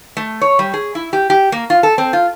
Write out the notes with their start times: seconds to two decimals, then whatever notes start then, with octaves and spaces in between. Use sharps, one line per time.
0.17 A3
0.41 C#5
0.59 G3
0.74 G#4
0.95 E4
1.13 G4
1.30 G4
1.52 A#3
1.70 F4
1.83 A4
1.98 C4
2.13 F4